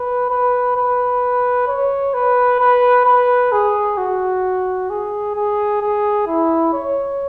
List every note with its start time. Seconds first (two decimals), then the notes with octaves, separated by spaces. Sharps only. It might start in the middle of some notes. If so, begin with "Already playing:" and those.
Already playing: B4
0.30 B4
0.76 B4
1.68 C#5
2.14 B4
2.60 B4
3.05 B4
3.52 G#4
3.98 F#4
4.90 G#4
5.35 G#4
5.81 G#4
6.27 E4
6.73 C#5